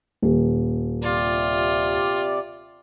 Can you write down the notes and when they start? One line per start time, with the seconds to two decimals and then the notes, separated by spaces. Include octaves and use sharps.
0.22 D#1
1.03 C3 F4 D5